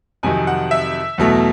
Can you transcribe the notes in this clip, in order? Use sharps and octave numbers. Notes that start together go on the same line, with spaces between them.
F2 C3 D#3 F#3 G#5
F#5
E5
E2 B2 F#3 A3